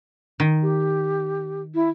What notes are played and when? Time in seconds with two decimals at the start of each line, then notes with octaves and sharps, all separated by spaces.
0.40 D#3
0.62 G4
1.75 E4